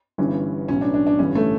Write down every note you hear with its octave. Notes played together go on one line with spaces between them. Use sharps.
G1 G2 E3 C#4
B1 A2 E3 C#4
D4
D4
D4
A1 G2 D3 C#4
A3